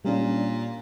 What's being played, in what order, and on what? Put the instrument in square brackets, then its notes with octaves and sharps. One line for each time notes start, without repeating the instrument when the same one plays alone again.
[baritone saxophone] A#2 [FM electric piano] G3 C#4 D4